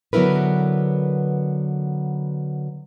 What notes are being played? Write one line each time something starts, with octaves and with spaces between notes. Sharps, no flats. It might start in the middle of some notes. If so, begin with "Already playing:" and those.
D3 F#3 B3 E4 A#4 B4